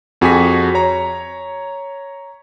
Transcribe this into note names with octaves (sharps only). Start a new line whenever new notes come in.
F2 F#4 G#4 G#5 C#6 B6
C#5 A#5